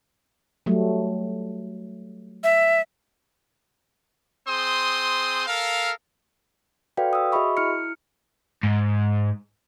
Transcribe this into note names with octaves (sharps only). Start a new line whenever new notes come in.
F#3 G3 A3
E5
C4 G#4 C5 C6 D#6
A4 A#4 F5
F#4 A4 B4 D5 F5 G5
D#6 E6
F#4 G#4 D#5 E5 B5 C#6
E4 F6 C#7
G#2